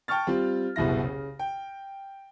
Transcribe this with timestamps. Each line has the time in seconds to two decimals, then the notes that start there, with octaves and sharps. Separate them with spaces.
0.08 G5 A5 C#6 F6 A6
0.27 G3 C4 F4
0.76 F#1 C2 B2 G3 E4 A#6
1.04 C#3
1.39 G5